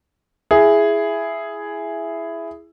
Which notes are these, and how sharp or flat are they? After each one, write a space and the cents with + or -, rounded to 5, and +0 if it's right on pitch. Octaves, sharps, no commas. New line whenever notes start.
E4 +10 G#4 +0